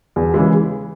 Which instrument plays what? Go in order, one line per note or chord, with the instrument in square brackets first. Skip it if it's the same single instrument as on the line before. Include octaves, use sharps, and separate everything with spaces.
[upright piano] E2
C#3 E3 G#3